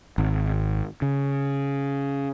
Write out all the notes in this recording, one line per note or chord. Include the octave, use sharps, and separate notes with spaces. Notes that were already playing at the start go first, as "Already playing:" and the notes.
G#1
C#3